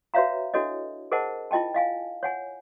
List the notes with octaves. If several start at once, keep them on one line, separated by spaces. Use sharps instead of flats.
F#4 B4 C#5 E5 F5 A#5
D4 E4 F#4 A4 C#5 D#5
G#4 A#4 C5 D#5 F#5 A5
E4 F4 D#5 G5 A5
D#5 F5 G#5
C#5 F#5 G#5